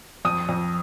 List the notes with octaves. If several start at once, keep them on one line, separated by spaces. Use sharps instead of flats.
F2 D#6
F2